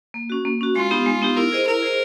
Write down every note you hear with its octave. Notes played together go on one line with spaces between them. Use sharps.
A#3
C#4 F#4
A#3
C#4 F#4
G#3 F4
B3 D#4 G4
G#3
B3 D#4 G4
E4 A#4
G#4 C5 D#5
E4 A#4
G#4 C5 D#5